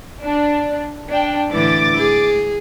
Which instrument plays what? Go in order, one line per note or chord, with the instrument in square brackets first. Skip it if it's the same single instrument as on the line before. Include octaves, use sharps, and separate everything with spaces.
[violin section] D4
D4 G5
[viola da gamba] A2 D3 E3 [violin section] D6 A6
[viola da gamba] G#4